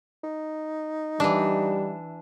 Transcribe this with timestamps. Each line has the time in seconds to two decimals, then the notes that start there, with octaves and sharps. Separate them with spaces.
0.24 D#4
1.20 E3 G3 D4